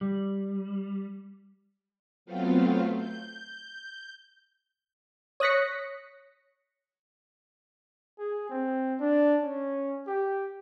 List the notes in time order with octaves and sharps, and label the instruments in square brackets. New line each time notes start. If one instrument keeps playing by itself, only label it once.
[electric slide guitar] G3
[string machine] F#3 A3 B3 C4 F4 F5
G6
[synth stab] C#5 D#6 F#6 A#6 B6 C#7
[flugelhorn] G#4
C4
D4
C#4
G4